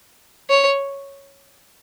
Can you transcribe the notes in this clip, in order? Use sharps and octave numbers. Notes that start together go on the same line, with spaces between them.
C#5